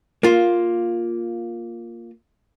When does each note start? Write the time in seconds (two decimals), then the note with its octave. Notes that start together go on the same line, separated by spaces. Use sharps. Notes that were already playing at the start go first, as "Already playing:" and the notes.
0.23 A#3 F4